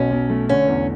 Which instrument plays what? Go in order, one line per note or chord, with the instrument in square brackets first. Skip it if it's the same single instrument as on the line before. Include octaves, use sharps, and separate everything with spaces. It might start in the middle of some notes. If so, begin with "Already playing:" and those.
Already playing: [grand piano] B1 B2 [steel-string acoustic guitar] C#4
[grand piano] B1
A3
[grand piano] D3 [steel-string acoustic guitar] C#4
[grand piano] E2